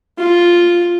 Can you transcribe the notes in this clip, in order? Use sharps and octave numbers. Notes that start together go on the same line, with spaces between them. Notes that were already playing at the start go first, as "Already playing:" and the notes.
F4